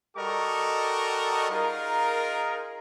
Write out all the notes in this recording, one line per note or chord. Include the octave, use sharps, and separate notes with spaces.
G3 F#4 A4 A#4 D#5 C#6
D#4 F4 G#4 A#4